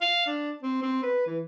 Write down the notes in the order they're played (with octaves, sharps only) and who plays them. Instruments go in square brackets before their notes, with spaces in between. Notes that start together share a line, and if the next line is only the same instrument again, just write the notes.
[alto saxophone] F5
D4
C4
C4
B4
E3